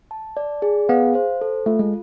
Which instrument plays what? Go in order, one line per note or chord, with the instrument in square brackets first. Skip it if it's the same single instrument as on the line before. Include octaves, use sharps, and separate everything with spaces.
[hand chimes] A5
D5
G#4
[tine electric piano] B3 [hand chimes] F5
[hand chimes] C5
A4
[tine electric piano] A3 [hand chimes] F4
[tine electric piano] G#3